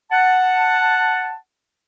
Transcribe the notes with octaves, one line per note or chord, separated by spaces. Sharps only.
F#5 A5